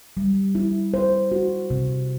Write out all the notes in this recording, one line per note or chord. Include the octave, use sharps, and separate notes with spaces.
G3
E4
C5
F#4
C3